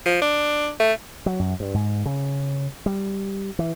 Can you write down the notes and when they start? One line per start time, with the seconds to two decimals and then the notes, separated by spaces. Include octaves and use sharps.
0.06 F3
0.22 D4
0.80 A3
1.26 F#3
1.40 F#2
1.60 G2
1.74 G#2
2.06 C#3
2.86 G3
3.59 E3